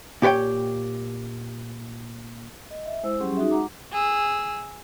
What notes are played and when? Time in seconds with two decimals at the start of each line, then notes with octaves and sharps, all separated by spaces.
0.22 A#2 G4 B4 C#5 G5
2.71 D#5
2.86 E5
3.03 G#3 E4 C5 E6
3.20 F#3 G3 C#4 G4 G#4 C6
3.37 D#4 F#4 G#4 E5
3.51 G#3 F#5 A#5 D6
3.93 G#4 E6